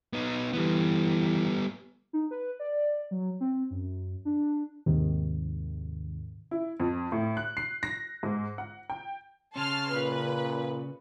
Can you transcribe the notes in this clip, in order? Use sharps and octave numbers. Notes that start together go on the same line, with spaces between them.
B3 D#4
E3 G3 B3
D#4
B4
D5
F#3
C4
F#2
D4
D#2 G#2 C3 D#3
E4
F2
A2
F#6
C7
A#6
G#2
F#5
G5
C#3 C#4 A5 C6 F6
A#2 B4